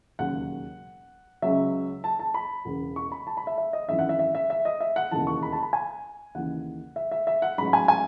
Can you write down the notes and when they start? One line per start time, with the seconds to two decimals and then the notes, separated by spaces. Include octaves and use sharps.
0.19 E1 D#2 C#3 F#3 F#5
1.42 C#2 C#3 F#3 E5
2.04 A5
2.19 A5
2.34 B5
2.65 E1 E2 C#3
2.96 C#6
3.12 B5
3.27 A5
3.37 B5
3.47 E5
3.58 E5
3.73 D#5
3.88 G#1 F#2 E3 E5
3.99 F#5
4.09 E5
4.19 E5
4.35 E5
4.50 E5
4.65 D#5
4.80 E5
4.96 F#5
5.11 E1 D#2 C#3 E3 A5
5.27 C#6
5.43 B5
5.52 A5
5.63 B5
5.73 G#5
6.35 D#2 C#3 E3 F#5
6.96 E5
7.12 E5
7.27 E5
7.42 F#5
7.58 A1 G#2 F#3 B5
7.73 G#5
7.88 G#5